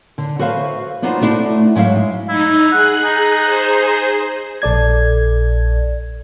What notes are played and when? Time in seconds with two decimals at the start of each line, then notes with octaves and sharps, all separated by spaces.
0.18 D3
0.39 F#4 A4 B4 C5 E5 F5
1.02 B3 D4 D#4 F4 F#4 C5
1.21 A3 D4 E4 F#4
1.75 G#2 F#3 E5 F5
2.28 D#4 E4
2.72 G#4 F#5 F#6
3.04 D#4
3.43 G#4 C5
4.62 A#1 A4 D5 G#6